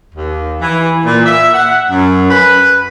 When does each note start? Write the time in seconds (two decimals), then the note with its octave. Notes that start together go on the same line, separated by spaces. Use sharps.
0.14 D#2
0.62 E3
1.06 A#2
1.26 E5
1.54 F#5
1.91 F#2
2.31 B4